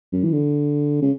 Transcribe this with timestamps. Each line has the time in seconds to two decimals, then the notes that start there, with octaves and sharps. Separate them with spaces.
0.12 F#2
0.23 E3
0.32 D3
1.02 C#3